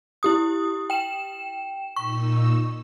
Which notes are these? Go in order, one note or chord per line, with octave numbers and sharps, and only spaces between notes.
E4 G4 D#6
G5 E7
A#2 D#4 C#6 E6